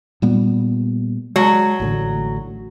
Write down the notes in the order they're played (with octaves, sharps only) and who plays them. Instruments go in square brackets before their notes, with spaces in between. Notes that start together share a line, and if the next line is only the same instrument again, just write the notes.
[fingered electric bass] A#2 G3 B3
[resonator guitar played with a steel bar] F#3 [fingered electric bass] G#3
[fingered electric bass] A1 A2 D3